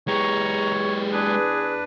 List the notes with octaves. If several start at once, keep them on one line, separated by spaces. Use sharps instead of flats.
E2 G#3 G4 C#5 A#5 C#6
D4 G#4 B4